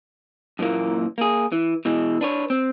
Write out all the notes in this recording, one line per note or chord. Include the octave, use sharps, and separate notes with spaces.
F#2 A#2 E3 A#3
A#3 G#4
E3
B2 E3 G#3
D4 B4 C#5
C4